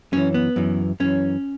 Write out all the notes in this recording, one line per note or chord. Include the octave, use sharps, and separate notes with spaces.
F#2 E3 C#4
B3
F#2 E3
F#2 E3 C#4